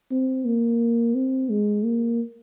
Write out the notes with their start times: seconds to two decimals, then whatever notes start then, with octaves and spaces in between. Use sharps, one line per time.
0.11 C4
0.45 A#3
1.15 C4
1.50 G#3
1.84 A#3